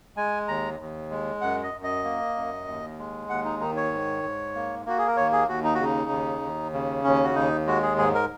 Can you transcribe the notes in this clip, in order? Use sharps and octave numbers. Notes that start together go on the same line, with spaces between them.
G#3 G#5
D#2 A#5
D#2
G#3
F#2 F#5
D#5
F#2
D#5
A#3
F#2
D#2
G#3
D#2 F#5
D#4
D#3 D#4
C#5
G#2
G#2
A#3
A#3 F#4
G#4
A#4
D#2 C#5
G#4
D#2 F#4
D#4
F#4
C#3 D#4
D#2
D#2
C#3
D#2 C#4
F#4
D#2 D#4
G#3 F#4
G#4
G#2 G#4
A#4